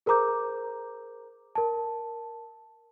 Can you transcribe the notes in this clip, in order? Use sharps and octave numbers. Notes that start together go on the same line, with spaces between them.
G#4 A#4 C5 A#5 D6 G6
A#4 A5